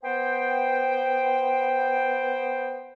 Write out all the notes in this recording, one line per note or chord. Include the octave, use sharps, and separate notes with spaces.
B3 C5 G5